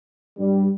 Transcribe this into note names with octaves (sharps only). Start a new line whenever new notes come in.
G2 G3